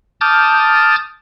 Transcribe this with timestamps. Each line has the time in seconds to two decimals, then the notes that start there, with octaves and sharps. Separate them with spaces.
0.21 A5 D6 D#6 F6 G6 A6